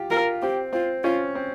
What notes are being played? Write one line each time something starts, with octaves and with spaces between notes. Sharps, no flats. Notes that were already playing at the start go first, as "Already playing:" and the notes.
Already playing: F4 G4
F4 A#4
C4 G4
C4 F4
C#4 F4
C4